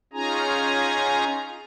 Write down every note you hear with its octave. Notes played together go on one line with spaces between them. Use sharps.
C#4 D#4 F4 G#4 G#5 A#5